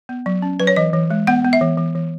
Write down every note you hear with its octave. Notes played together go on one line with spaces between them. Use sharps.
B3
F#3
C#4
F#3 B4
C#5
E3 D#5
E3
G#3
B3 F#5
B3
E5
E3
E3
E3